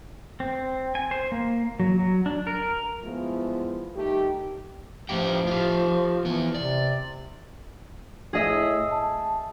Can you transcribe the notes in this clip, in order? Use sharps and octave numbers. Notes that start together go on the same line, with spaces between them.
C4
G#5
C5
A#3
F#3
F#3
D4
A#4
F3 G#3 A3 B3 E4 F4
D#3 G3 A3 G4
A2 F3 G4 G5
F4 G4
E2 B3
C3 D5
A2 G#4 D#5 E5
A5